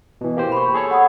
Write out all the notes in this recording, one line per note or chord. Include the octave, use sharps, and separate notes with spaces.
B2 E3
A#3 G4 C5
B5 C#6
G#4 A4 C#5
F#5 B5 D#6